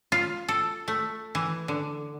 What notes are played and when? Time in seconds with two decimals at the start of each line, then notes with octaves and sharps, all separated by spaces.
0.12 F4
0.48 A4
0.88 A3
1.35 E3
1.68 D3